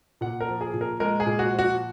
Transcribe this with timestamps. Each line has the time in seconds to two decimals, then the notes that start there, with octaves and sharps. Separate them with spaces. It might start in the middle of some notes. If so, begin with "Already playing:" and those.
0.21 A#2 F#5
0.41 A#4
0.48 F3
0.61 G#4
0.74 A#2
0.81 A#4
1.00 G#3 A#4
1.20 G#4
1.26 A#2
1.39 F#4
1.52 F3
1.59 F#4